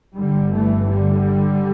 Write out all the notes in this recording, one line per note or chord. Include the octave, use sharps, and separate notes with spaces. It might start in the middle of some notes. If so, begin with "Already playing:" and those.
G1 G2 D3 G3
E3 A3
D3 G3